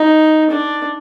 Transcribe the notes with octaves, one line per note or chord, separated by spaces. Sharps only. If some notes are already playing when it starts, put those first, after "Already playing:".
Already playing: D#4
D4